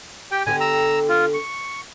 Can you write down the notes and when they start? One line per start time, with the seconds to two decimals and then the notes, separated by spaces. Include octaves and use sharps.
0.32 G4 G5
0.46 D3 B3 G4 G#5
0.60 A#5 E6
1.09 F4
1.34 C#6